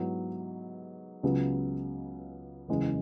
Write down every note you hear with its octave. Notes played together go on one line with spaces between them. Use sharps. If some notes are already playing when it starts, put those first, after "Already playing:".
Already playing: G#2 F#3 B3 E4
C#2 C#3 F#3 B3
F#1 E2 C#3 G#3